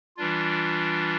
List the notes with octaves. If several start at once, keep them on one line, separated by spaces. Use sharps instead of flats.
E3 G3 D4 F4